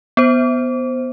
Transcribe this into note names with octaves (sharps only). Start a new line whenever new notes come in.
B3 C5